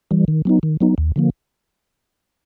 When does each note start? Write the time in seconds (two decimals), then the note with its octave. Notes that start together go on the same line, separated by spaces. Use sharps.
0.11 E3 G3
0.28 D#3
0.45 F#3 B3 D#4
0.63 D#3
0.81 F#3 B3 D#4
0.98 D#2
1.16 D3 F3 A#3